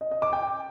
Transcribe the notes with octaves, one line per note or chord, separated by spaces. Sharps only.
D#5
D#5
D6
G5